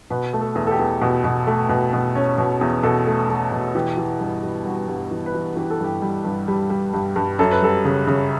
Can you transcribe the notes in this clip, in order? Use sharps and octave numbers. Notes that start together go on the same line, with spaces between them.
B2 B4
A3
A4
E2
A4
G4
E2
B2
B2
A3
B2
B2
C#4
B2
E2
B2 A4
A3
A3
B2
E3 G4
E3
G2
G3
G2 F#4
G2
G4
E3
B4
E3
E3 G4
A4
G2 G4
G3
G2
G3
G3
G2
G2
F#2 A4
B4
G3 A4
C#3
C#3